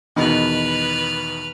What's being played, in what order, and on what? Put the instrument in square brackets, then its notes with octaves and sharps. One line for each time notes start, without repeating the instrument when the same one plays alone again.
[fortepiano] E2 B2 D#3 [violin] B4 F6